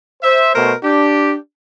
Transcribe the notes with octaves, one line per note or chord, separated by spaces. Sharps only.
C5 E5
B2 A3 A#4 C5
D4 G4